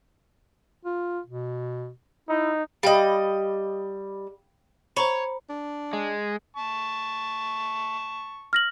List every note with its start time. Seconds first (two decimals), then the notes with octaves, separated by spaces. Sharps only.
0.85 F4
1.26 B2
2.29 D#4 E4
2.83 G3 D#5 F5 G5 B5
4.96 C5 C#5 A#5 B5
5.49 D4
5.93 G#3
6.57 A5 C#6
8.53 F6 A#6 F#7